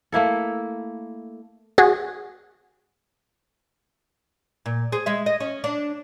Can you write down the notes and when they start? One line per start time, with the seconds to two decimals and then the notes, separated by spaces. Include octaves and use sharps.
0.12 A3 A#3 E4 A4
1.78 F#4 G#4
4.66 A#2
4.92 G#4 C5
5.06 G#3 E5
5.26 D#5
5.40 C#4
5.64 D4